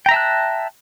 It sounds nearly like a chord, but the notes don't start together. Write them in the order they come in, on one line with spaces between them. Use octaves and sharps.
G5 A#5 E5 A5 F#6